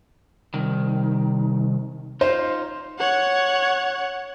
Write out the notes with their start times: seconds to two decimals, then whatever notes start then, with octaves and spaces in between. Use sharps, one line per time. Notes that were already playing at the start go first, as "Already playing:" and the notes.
0.54 C2 D#3
2.21 D#4 F4 C5
2.99 C#5 F#5